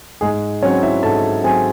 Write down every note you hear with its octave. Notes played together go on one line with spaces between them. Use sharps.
G#2 G#3 G#4
F#3 C4 C#4 C#5
E4 E5
G#2 A4 A5
F#3 C4 G#4 G#5